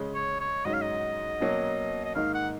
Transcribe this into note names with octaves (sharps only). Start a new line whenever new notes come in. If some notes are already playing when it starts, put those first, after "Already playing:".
Already playing: C#3 G#3 C#4
C#5
C#5
G#2 F#3 C#4 D#5
F5
D#5
B2 F#3 A#3 C#4
D#5
G#2 D#3 A#3 D#4 F5
F#5